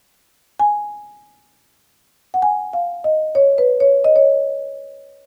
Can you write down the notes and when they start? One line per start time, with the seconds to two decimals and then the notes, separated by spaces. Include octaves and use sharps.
0.60 G#5
2.34 F#5
2.42 G#5
2.73 F5
3.04 D#5
3.35 C#5
3.58 B4
3.80 C#5
4.04 D#5
4.16 C#5